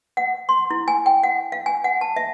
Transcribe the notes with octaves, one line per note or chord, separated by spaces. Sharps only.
F#5
C6
E4
G#5
G5
F#5
F5
G#5
F#5
A5
E5